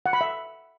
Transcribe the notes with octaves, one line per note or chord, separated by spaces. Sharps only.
F#5
B5
E5